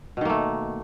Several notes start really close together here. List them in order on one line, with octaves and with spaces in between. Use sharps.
B2 D#3 A#3 A3